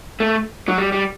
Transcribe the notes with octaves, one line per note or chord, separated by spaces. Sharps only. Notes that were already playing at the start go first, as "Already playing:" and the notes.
A3
F#3
G3
G3